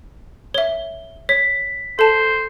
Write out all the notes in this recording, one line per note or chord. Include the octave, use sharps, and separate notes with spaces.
C#5 E5 G7
C#5 B6
A4 C5 A5